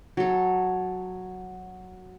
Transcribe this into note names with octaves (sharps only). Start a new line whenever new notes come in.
F#3 A4